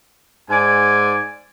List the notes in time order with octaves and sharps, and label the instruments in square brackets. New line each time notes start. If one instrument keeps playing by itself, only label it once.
[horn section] G#2 D5 G#5